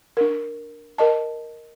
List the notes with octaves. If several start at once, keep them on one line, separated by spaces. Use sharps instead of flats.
D4 A#4
A#4 D#5 A5